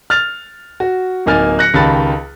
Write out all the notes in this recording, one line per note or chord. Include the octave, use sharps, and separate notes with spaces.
F6 A6 F7
F#4
D1 A#3 D#4 G#5 F6 A6
F#6 A#6 C#7
C#2 D#3 G4 A5 B5 A6